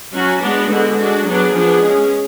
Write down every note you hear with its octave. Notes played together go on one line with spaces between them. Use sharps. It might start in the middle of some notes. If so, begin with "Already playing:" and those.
F#3 C#4 F#4
G#3 B3 D4 F#4
D3 G#3 B3 F#4
G#3 D4 F#4
F#3 B3 D4 G#4
F3 B3 D4
G#3 C#4